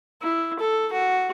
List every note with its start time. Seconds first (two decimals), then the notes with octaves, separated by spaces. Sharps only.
0.23 E4
0.60 A4
0.93 F#4